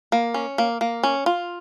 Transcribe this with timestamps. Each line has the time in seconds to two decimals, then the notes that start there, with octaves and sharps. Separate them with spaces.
0.12 A#3
0.34 C#4
0.58 A#3
0.81 A#3
1.03 C#4
1.26 F4